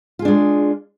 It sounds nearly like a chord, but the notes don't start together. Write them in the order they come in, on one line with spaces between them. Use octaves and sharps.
F4 G#4 D4 G#3